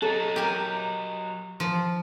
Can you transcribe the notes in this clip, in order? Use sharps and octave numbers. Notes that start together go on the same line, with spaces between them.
F#3 D#4 A4 B4
G4 A#4 G#5
F3